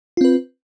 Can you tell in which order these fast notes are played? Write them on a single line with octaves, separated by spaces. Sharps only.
F4 C4 B4